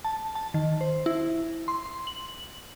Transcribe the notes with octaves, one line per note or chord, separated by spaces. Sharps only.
A5
A5
D#3
C5
E4
C6
F#7